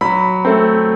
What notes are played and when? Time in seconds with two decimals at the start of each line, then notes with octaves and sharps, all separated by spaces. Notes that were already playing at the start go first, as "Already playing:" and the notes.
0.01 F#3 B5
0.45 A3 C4